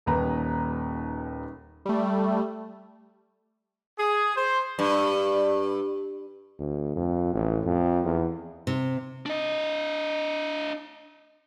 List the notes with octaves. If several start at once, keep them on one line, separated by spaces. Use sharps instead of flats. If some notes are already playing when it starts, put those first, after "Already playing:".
D#1 D#2 B4 A#5
G3 A3
G#4
C5
G2
D2
F2
A1
F2
E2
C3
D4 D#5